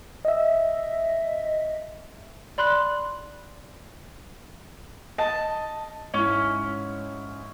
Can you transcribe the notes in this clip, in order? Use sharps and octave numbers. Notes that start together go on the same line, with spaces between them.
D#5 E5
D5 B5 C6 F#6
D#5 A5
G#2 C#4 E4